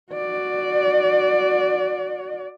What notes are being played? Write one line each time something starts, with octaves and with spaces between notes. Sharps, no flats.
F#4 D5